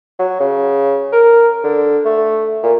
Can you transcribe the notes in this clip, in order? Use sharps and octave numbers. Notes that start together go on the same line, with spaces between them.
F#3
C#3
A#4
D3
A3
A#2